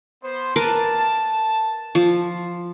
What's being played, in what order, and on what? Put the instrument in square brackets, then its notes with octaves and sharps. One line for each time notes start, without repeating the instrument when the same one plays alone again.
[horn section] B3 C5
[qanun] A#4 B4 D6 [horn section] A5
[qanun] F3